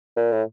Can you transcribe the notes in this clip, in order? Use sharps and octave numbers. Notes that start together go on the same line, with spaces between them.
A#2
A2